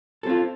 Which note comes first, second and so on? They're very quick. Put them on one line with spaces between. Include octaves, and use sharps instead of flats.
A4 C4 F4